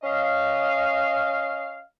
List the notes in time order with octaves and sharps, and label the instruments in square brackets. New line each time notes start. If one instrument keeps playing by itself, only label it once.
[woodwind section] C#4 D#5 F5